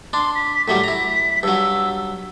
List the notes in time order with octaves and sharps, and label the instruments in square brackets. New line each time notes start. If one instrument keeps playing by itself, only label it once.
[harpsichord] D4 [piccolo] C6
[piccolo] B6
[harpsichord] A2 F#3 G3 [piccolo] B6
[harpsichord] E4 A#5
[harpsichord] G2 F#3 [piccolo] E6